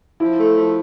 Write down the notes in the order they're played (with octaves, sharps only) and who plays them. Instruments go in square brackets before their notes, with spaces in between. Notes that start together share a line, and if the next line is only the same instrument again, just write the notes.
[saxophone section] F3 [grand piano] E4
[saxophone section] A3
F3